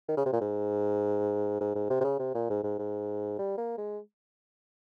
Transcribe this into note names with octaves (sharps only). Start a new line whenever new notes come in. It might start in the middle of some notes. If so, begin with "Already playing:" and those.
D#3
C#3
C3
A#2
G#2
G#2
G#2
C3
C3
C#3
C3
A#2
G#2
G#2
G#2
G3
A#3
G#3